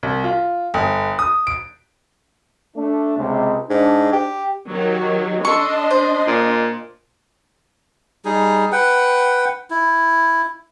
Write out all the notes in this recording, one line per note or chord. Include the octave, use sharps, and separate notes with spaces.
C2
F4
G1
D#6
D7
A3 D4
C#2 C3 G#3
G#2 D4
G4
D#3 F#3 G4
D4 A4 D#5 C6 C#6
C5
A#2
G3 D#4 G#4
B4 F#5 G5
E4